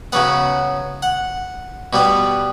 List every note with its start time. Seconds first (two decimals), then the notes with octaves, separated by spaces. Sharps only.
0.12 C#3 F#3 B3 F#5
1.02 F#5
1.93 B2 G3 B3